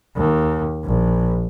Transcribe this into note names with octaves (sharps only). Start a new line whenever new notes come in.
D#2
A#1